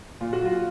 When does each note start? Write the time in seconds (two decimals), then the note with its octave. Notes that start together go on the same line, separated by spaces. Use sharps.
0.21 A#2 F4
0.33 F#4
0.40 F#3 F4